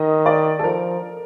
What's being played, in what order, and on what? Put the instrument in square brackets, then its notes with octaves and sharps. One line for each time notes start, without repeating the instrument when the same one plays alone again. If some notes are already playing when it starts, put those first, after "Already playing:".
Already playing: [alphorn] D#3 [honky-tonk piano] D#5
[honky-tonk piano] D5
A4
[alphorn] F3 [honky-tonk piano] A#4